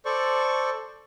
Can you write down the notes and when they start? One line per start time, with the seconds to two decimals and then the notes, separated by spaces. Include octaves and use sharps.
0.05 A4 C5 D5 C#6